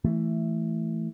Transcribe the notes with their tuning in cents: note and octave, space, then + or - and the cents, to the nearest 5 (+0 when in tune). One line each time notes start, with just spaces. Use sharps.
E3 +0 A3 +0